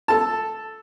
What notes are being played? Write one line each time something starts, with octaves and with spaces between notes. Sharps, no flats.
A4 A5